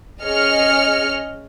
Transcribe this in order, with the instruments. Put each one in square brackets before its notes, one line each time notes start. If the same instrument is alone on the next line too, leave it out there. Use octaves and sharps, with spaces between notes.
[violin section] C#4 G#4 D#5 F6 C#7